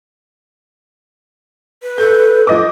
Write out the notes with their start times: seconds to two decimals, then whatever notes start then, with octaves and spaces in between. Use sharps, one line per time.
1.83 B4
1.98 A4 G6
2.47 F3 D#5 D6